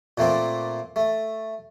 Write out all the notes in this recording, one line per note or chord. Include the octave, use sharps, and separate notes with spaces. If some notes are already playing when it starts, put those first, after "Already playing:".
A#2 A3 A#3 C4
A3